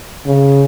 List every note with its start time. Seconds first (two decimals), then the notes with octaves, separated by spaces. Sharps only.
0.26 C#3